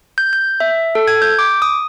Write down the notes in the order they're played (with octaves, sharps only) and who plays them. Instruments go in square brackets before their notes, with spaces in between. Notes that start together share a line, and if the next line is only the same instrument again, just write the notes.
[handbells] G6
G6
E5
A4
G#6
G6
D6
D#6